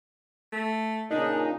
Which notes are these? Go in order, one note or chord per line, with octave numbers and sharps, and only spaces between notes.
A3
A#2 C#3 A#3 D4 D#4